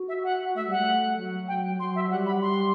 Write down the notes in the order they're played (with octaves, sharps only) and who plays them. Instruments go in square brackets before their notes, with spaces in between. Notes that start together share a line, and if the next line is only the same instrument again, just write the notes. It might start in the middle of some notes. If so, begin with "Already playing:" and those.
Already playing: [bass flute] F#4
[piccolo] E5
F#5
[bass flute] A3 [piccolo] E5
[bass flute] G3 [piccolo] F#5
[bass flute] A3
F#3
[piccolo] G5
[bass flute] F#3 [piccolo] C6
[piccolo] E5
[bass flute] G3 [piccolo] F#5
[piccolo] B5
C6